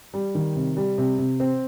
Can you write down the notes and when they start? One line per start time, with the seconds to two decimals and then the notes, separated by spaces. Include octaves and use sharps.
0.14 G3
0.35 D#3
0.56 C3
0.77 G3
0.98 C3
1.19 C3
1.40 C4